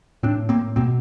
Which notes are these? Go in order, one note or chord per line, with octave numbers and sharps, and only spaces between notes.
A2 C4 D4
A#3 C4
B2 A#3 C4